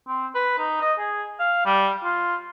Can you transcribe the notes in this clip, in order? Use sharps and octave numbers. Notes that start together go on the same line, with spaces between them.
C4
B4
D#4
D#5
G#4
F5
G3
F4